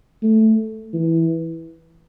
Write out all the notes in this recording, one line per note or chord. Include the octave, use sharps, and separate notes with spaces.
A3
E3